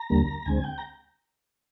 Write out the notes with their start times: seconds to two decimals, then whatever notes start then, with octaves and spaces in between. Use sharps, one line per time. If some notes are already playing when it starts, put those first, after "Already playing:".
Already playing: A#5
0.10 D#2 D3 G3 A#3
0.46 D2 D3 G#3 C4 G#5
0.64 G5
0.78 A#5